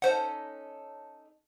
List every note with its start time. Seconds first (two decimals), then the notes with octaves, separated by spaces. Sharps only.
0.02 C#4 D#4 A4 C5 F#5